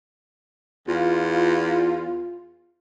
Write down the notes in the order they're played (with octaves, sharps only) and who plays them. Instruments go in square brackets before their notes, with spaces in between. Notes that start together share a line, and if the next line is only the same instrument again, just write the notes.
[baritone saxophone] E2 [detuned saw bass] F4